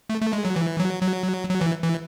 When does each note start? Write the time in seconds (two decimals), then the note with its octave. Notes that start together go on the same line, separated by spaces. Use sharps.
0.10 A3
0.21 A3
0.33 G#3
0.45 F#3
0.56 E3
0.80 F#3
1.02 F#3
1.49 F#3
1.61 E3
1.84 E3